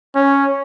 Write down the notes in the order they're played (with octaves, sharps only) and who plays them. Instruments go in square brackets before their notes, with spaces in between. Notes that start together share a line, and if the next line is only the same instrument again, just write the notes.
[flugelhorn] C#4